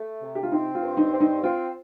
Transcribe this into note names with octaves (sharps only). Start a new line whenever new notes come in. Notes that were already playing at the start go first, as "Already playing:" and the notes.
Already playing: A3
C3
G4
F4
C4 D#4
F4
G2
D#4
C4
D#4
C4 F4